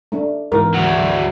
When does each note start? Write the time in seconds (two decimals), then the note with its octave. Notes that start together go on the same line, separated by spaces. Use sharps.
0.12 A3 D4
0.52 G#2 E3 B3 A#4
0.74 D2 F#3